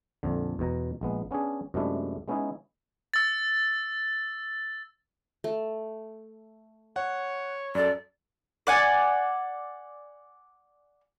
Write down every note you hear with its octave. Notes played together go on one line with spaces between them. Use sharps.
A#1 F2 D3
E2 B2 A#5
A#1 G#3 B3
B3 C#4 D4 G#4
F#2 C3 G#3 A3 D4 E4
G#3 B3 C#4 D#4 E4 G#4
E6 A6
A3
C#5 F#5
F#2 A4 D5
D5 F#5 G#5